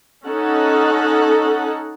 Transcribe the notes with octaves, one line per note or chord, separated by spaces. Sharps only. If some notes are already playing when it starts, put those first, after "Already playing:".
C#4 D#4 A4 F#5